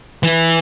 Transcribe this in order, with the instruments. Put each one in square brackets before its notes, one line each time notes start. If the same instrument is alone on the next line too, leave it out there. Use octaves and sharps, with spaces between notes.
[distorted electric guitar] E3